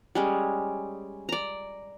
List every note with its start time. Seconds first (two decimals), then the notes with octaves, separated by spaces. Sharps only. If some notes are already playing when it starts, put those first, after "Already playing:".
0.15 G3 G#3 C#4
1.29 D5 A#5